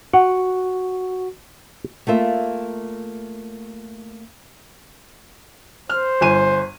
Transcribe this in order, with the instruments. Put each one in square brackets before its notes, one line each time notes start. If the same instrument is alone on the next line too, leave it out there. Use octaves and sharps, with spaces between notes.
[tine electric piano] F#4 [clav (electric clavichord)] F#5
[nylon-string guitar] A3 A#3 F4 E5
[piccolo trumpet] C5 [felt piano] F6
[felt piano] G1 G#5 D#7